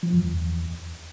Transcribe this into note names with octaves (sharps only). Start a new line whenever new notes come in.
F3
F#2
E2